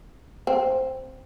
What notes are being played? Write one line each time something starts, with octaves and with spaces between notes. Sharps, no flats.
C4